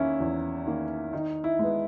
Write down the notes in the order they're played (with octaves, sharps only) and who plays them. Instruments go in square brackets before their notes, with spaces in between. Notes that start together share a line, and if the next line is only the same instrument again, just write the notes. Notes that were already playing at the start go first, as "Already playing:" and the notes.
Already playing: [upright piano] E2 D#3 A#3 [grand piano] C#4 E4
[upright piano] E2
D#3 A#3
[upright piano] D#3 [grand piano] D#4
[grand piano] E4
[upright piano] G#3 B3